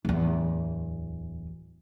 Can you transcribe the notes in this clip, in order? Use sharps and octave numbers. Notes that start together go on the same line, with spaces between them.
D1 E2